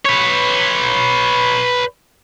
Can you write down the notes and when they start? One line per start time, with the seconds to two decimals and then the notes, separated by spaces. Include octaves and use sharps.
0.05 B4 C#5